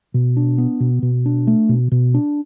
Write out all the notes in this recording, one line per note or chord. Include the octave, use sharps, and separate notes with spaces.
B2
D4
B3
B2
B2
D4
A3
B2
B2
D4